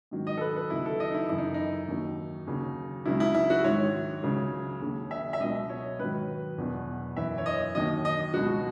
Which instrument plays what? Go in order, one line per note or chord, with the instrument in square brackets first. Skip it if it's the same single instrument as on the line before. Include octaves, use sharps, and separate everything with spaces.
[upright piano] G#2 D#3 F#3
D#5
A4
B4
B4
D#2 C#3 F#3 E4
A4
D#5
D#4
E4
F#2 C#3 E3 E4
D#4
D#4
D#2 D#3 F#3
D#2 C#3 F#3
C#2 C#3 F#3 E4
E4
E4
F#4
G#2 D#3 F#3 C#5
C#2 C#3 F#3
D#2 C#3 F#3
E5
E5
C#2 B2 F#3 D#5
C#5
G#2 D#3 F#3 B4
E2 B2 F#3
F#2 E3 E5
C#5
D#5
D#2 D#3 F#3 D#5
D#5
C#2 B2 F#3 F#4